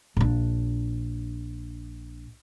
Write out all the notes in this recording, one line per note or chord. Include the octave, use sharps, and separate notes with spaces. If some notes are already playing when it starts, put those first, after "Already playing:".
A#1 D4